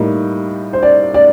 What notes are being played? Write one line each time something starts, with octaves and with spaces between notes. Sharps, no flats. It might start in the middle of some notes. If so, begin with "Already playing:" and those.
Already playing: A2 G3 A#3 D#4
C5
D5
D5